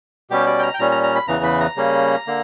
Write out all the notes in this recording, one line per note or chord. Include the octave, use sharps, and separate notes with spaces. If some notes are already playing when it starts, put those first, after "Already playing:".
B2 G3 C#4 G4
D5
G5
A#5
G5
A#2 G3 C#4 A#5
A#5
A#5
B5
E2 C#3 E3 A#5
B5
A#5
C#3 G3 A#3 C#4
D3 A#3